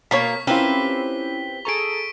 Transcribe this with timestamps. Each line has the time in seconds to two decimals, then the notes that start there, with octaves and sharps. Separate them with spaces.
0.11 B2 A#3 A#4 C#5 B6
0.47 C4 C#4 E4 F4 G4 A#4 B4 G7
1.65 G#4 A4 A#5 C#6 D7